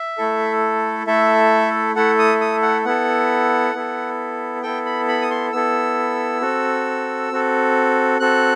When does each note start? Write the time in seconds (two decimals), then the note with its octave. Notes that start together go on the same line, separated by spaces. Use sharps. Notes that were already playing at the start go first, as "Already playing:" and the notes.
Already playing: E5
0.18 A3 E4 A4
1.07 A3 E4 A4 E5
1.95 A3 E4 A4 F#5
2.18 D#6
2.41 D#6
2.62 F#5
2.85 B3 E4 A4 F#5
3.74 B3 E4 A4
4.63 B3 E4 A4 G5
4.86 B5
5.08 B5
5.22 D#6
5.31 C6
5.53 B3 E4 A4 E6
6.41 C4 F#4 A4
7.31 C4 F#4 A4
8.20 C4 F#4 A4 F#6